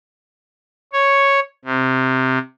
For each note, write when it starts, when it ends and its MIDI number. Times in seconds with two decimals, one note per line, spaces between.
0.93 1.40 73
1.65 2.38 48